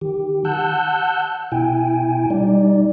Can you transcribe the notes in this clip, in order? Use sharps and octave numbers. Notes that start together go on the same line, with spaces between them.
D#3 G4
F#5 A5 E6 F#6 G6
B2 E4 G5 G#5
G3 D#4 D5